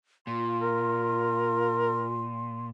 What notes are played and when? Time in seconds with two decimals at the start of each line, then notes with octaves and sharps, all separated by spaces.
0.27 A#2 F4 C6
0.61 A#4